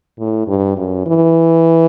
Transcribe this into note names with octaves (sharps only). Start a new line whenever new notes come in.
A2
G2
F#2
E3